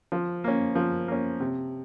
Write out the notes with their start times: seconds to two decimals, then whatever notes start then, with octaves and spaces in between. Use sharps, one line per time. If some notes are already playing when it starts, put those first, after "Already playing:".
0.12 F3
0.44 A#3 C#4
0.75 F3
1.08 A#3 C#4
1.40 C3